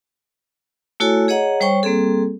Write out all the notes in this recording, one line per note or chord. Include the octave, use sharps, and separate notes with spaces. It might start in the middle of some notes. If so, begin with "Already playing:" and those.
A3 E4 F#4 A4 C#5 G#5
G#4 C#5 D#5 F#5 A#5
G3 C5 C#5 G5 C#6
G3 A#3 C4 G#4 A4